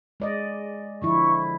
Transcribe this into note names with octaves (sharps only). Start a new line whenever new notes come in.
G#3 D5 D#5
D3 F3 E4 C#6